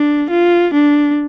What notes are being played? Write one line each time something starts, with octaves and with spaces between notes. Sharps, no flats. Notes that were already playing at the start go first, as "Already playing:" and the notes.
Already playing: D4
F4
D4